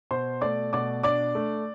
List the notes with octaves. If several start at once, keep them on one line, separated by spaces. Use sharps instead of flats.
B2 C5 C6
A3 D5 D6
B2 D5 D6
D4 D5 D6
A3